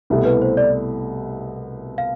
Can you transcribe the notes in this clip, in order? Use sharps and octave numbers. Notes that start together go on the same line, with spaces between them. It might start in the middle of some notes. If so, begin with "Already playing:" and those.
C2 B2 A3 E4 G4
B4
C5
D5
F5